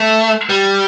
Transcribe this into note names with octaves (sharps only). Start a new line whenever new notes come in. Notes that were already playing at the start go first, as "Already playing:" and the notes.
Already playing: A3
G3